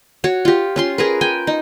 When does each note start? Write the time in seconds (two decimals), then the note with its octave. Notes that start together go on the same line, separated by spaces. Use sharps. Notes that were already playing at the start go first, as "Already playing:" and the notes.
0.24 F#4 C#5
0.45 F4 G4
0.76 C#4 F4 C6
0.98 G#4 A#4 B4
1.21 G5 G#5
1.47 D#4